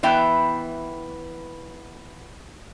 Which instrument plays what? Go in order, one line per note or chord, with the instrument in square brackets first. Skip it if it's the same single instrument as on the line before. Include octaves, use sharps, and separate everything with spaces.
[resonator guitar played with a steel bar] E3 B3 E5 G5